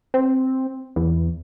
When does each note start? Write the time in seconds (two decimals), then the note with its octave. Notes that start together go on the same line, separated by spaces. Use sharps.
0.14 C4
0.96 E2